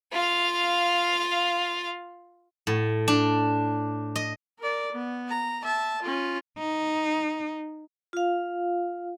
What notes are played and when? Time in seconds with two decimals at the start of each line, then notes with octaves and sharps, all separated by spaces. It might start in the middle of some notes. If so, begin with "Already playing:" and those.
0.12 F4 F5
2.67 A2
3.08 D4
4.16 D#5
4.59 A#4 D5
4.92 B3
5.29 A#5
5.63 E5 A5
6.03 C#4 F4
6.58 D#4
8.13 F4 F5